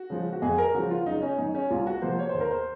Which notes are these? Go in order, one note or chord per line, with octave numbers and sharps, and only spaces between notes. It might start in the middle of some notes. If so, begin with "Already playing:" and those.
Already playing: F#4
C#3 F3 G#3
F#4
F2 G#4
A#4
C#3 F3 F#4
F4
F#1 D#4
C#4
F#2 D#3 D#4
C#4
C2 F4
F#4
C3 F3 A#3 C5
C#5
D#2 C5
A#4
C5